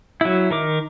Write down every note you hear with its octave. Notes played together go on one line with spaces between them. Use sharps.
F#3 E4
D#3 A#4 D6